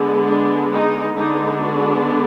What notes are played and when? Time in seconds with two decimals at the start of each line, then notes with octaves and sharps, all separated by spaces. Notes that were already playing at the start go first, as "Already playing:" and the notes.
Already playing: D3 G#3 B3
0.27 D4
0.72 D#4
1.16 D3 G#3 B3 D4 D#4
1.61 F#4